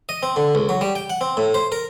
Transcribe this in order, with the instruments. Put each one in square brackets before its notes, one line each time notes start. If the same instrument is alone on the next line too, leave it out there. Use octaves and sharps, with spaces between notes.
[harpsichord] D#5
C4
D3
C#2
F#3
G3
G5
F#5
C4
A2
C5
A#4